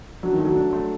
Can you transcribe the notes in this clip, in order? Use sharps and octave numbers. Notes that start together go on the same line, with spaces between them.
F#3 D4
D#3
A3
F#3
D4
A3